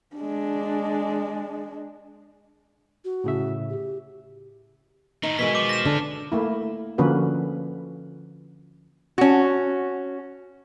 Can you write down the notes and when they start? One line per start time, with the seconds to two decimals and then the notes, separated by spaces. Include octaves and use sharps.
0.16 G#3 D4
3.05 F#4
3.24 A2 C#3 E5
3.70 G4
5.23 A2 D#3 D#4
5.39 B2 D#3 E3 G#3 B6
5.55 F3 D6
5.69 A#6 E7
5.85 D3 D4
6.32 A3 A#3 E4
6.98 D3 F3 A#3 C#4 F#4 B4
9.18 C#4 F#4